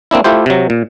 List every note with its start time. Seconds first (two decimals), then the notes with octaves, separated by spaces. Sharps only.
0.11 A#3 C4 D4 E4
0.24 A3 E4 F4 G4 C5
0.46 C3 F#3
0.70 A#2